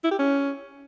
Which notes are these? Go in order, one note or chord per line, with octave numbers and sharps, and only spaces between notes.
E4
G4
C#4